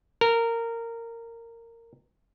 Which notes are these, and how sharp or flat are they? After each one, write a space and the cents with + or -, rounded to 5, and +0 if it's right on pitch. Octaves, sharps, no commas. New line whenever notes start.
A#4 -15